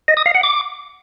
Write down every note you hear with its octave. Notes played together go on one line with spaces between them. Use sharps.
D#5
D#6
F5
F#5
D6